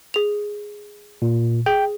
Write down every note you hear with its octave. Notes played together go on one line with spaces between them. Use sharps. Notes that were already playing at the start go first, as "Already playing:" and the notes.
G#4 F7
A#2
G#4 G5